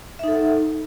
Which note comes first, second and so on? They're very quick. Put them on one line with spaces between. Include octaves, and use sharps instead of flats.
E5 D#4 A4 F#5